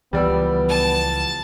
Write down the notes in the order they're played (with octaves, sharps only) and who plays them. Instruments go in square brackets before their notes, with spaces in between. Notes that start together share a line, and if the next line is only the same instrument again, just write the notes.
[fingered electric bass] C#2 E3 F3 [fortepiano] G3 D5 E6 [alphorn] B3
[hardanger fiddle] A5